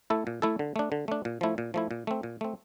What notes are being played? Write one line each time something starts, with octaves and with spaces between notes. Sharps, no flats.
A3 E4 A4
A#2
A3 E4 A4
D3
A3 D4
D3
A3 D4
A#2
F3 A3 E4
A#2
F3 A3 E4
A#2
A3 C4
A#2
A3 C4